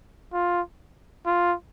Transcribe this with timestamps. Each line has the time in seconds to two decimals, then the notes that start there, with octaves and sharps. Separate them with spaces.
0.33 F4
1.26 F4